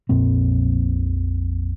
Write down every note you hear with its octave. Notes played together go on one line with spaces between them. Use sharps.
A#1 F2 A#2 C4